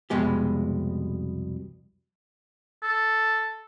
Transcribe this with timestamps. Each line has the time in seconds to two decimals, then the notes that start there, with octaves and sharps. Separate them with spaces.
0.10 C2 F2 B2 G#3 G4
2.83 A4